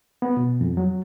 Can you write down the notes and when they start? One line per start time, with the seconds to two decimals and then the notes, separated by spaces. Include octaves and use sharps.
0.22 B3
0.37 B2
0.61 F2
0.77 F#3